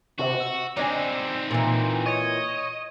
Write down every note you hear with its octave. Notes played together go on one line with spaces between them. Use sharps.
C3 F#4
E6
C4 D4 D#4 D#5 G#5
A#2 E3
C#5 D#5